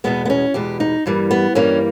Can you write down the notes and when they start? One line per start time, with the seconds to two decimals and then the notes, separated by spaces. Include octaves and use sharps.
0.04 E2 B2 G#3 B3
0.25 B3
0.30 C#4
0.54 E2 B2 G#3 G4
0.80 D#4
1.06 G2 E3 G3 A#3
1.31 B3
1.55 G2 E3 G3 A#3 C#4